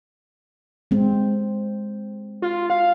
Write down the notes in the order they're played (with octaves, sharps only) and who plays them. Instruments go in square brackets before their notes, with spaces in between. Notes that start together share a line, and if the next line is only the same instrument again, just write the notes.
[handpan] G#3 C4
[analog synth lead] F4
F5